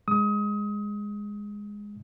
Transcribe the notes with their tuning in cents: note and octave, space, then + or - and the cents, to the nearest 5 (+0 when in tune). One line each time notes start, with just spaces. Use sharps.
G#3 -10 D#6 +30